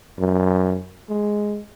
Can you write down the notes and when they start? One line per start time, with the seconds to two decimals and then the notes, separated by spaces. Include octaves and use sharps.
0.20 F#2
1.10 G#3